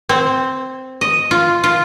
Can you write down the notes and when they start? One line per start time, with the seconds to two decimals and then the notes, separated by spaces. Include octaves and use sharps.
0.09 C4
1.01 D#5
1.31 F4
1.64 F4